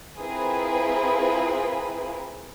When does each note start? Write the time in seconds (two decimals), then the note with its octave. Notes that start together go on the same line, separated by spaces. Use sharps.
0.18 C4 E4 F4 G#4 A#4 B4